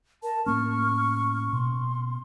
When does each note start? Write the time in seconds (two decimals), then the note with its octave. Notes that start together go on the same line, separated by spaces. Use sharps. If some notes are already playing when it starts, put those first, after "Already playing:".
0.23 A#4 A5
0.46 A2 A#3 C#4 C#6 F6
1.53 B2 C6